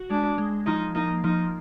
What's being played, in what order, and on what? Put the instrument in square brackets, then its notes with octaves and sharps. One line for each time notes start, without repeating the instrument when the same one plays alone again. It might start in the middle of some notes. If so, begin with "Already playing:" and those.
Already playing: [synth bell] F#4
[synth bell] G#3 [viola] D4
[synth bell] G#3
[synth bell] F3 [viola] D#4
[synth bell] A#3 [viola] D#4
[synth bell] F3 [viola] D#4